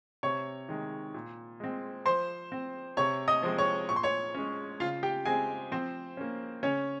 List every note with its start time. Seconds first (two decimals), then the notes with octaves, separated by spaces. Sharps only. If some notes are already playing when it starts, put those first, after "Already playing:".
0.23 C3 C#5 C#6
0.69 D#3 G#3
1.14 A#2
1.60 G#3 C4
2.06 F3 C5 C6
2.52 C4
2.97 C3 C#5 C#6
3.28 D#5 D#6
3.43 F3 G#3 C4
3.58 C#5 C#6
3.89 A#2 C#6
3.96 C6
4.03 C#5 C#6
4.35 G#3 C#4
4.80 C#3 F4 F5
5.03 G4 G5
5.25 G#3 C4 G#4 G#5
5.71 F3 C4 C5
6.17 A#3 C#4
6.63 C#3 C#4 C#5